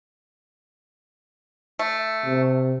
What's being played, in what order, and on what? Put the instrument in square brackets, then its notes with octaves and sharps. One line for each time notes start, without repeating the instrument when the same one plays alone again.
[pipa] A3
[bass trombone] C3